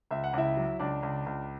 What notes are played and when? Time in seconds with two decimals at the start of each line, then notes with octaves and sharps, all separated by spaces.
0.11 C#2 E5
0.24 F#5
0.33 C#2 E4 E5
0.57 F#3
0.79 C#2 D4 D5
1.03 C#2
1.26 C#2